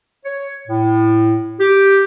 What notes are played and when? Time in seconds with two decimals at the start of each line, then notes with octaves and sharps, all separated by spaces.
0.25 C#5
0.68 A2
1.59 G4